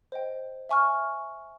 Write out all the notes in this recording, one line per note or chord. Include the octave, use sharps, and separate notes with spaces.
C5 D#5 G5
E5 G#5 C#6 F6